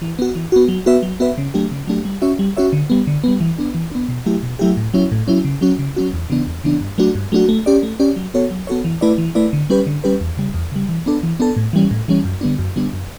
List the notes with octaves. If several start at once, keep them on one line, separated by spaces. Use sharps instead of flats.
E3
B3 F#4
E3
B3 F#4
F#3
B3 F#4 B4 E5
F#3
B3 F#4 B4 E5
C#3
F#3 A3 D4 G4
C#3
F#3 A3 D4 G4
G3
C#4 F#4 C#5 E5
G3
C#4 F#4 C#5 E5
D3
G3 B3
D3
G3 B3
E3
B3 D4
E3
B3 D4
B2
F#3 A3 E4 G4
B2
F#3 A3 E4 G4
A2
F#3 C#4 E4
A2
F#3 C#4 E4
C#3
F#3 C#4 F#4
C#3
F#3 C#4 F#4
E2
C#3 E3 B3 D4
E2
C#3 E3 B3 D4
G2
F#3 A3 D4 F#4
G2
F#3 A3 D4 F#4
A3
C#4 G4 D5
A3
C#4 G4 D5
F#3
B3 F#4 A4 C#5
F#3
B3 F#4 A4 C#5
E3
A3 E4 B4 D5
E3
A3 E4 B4 D5
D3
G3 C#4 G4 B4
D3
G3 C#4 G4 B4
E2
C#3 G3
E2
C#3 G3
E3
B3 D4 A4
E3
B3 D4 A4
A2
E3 G3 C#4
A2
E3 G3 C#4
F#2
D3 G3 B3 D4
F#2
D3 G3 B3 D4
F#2